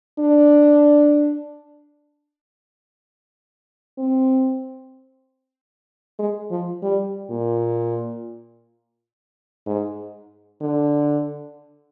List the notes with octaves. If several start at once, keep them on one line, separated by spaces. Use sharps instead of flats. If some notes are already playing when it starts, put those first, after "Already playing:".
D4
C4
G#3
F3
G3
A#2
G#2
D3